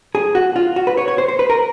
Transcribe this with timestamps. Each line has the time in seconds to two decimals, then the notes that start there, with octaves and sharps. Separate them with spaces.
0.15 G#4
0.35 F#4
0.56 F4
0.76 F#4
0.87 B4
0.97 C#5
1.08 C#5
1.18 C5
1.28 C5
1.39 B4
1.50 A#4